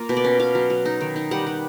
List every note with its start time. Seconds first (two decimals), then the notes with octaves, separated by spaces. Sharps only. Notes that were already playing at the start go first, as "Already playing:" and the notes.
Already playing: A#3 F4
0.09 B2
0.17 D5
0.24 C#4
0.39 B2 F5
0.55 F#3
0.70 F#3
0.85 D#4
1.01 D#3
1.16 D#4
1.31 G3 F#5
1.47 G3